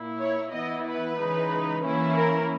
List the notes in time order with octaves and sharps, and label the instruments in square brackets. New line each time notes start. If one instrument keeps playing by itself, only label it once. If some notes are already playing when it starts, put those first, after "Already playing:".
Already playing: [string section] A#2 A#3 E4
C#5
E3 B3 E4 D#5
B4
C#3 E3 G#3 D#4
E3 A#3 C#4 E4
A#4